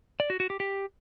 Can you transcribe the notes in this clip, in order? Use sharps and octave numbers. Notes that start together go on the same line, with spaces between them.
D5
F#4
F#4
G4
G4